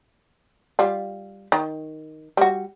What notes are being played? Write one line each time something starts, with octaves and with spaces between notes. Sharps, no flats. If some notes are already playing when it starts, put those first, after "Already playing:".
G3 F4
D#3
G3 F#4